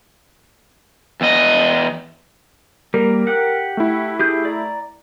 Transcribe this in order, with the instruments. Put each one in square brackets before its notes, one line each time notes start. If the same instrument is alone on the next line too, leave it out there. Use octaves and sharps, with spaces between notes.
[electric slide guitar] E2 D#5
[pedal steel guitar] G3 A#3 [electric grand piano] A#4
[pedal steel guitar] G4 F#5
[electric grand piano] A3 E4
[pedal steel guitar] G4 G#4 G6
D5 A#5